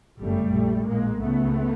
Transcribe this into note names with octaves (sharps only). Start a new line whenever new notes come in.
G1 F#2 C#3 G3 A3
A#1 A#2
A#1 A2 G#3 A#3
C#2 A3 B3
C#3